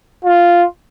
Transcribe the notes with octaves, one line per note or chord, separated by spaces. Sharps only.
F4